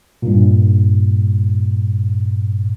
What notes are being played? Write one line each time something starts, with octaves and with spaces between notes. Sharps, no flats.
G2 A#2